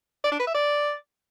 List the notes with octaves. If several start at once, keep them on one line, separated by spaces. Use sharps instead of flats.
D5
D4
B4
E5
D5